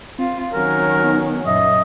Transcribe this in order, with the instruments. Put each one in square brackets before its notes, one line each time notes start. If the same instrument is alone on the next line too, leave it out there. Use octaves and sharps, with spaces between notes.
[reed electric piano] C4 [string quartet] F4
[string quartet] D#3 F#3 C#4 [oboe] A#4
[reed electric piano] B3 D#4
[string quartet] F#2 [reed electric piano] A#2 E5 [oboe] D#5